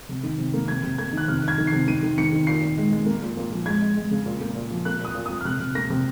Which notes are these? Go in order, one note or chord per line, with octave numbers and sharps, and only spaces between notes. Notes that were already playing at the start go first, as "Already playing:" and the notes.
C3
D#3
C3
A#3
C3 G#6
C3
A#3 G#6
D#3 F#6
C3 F6
D#3 G#6
D#3
C7
C3
D#3 D#7
D#3
D#3 C#7
D#3
A#2 C7
A#2
G#3
G#3
A#3
A#2
A#2
F3
G#3 G#6
G#3
G#3
C#3
A#2
A#3
A#2
F3
A#3 F#6
A#2 D#6
A#2
A#2 D#6
F6
C3 F#6
C3
A#3 A#6
C3